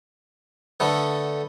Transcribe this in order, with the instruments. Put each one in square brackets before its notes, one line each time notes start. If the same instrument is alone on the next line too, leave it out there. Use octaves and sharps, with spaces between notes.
[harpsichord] D3 A3 B3